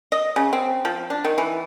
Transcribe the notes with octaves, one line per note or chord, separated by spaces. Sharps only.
D#5
C#3
C4
F3
D4
D#3
E3